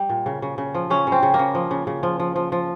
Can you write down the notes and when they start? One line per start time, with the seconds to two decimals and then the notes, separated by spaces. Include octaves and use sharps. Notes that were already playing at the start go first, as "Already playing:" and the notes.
Already playing: G3
0.09 A#2
0.26 C#3
0.42 C#3
0.58 C#3
0.75 F3
0.90 C#3 C#4
1.07 C#3 C4
1.23 C#3
1.34 A#3
1.39 C#3
1.55 F3
1.71 C#3
1.87 C#3
2.03 F3
2.19 F3
2.36 F3
2.52 F3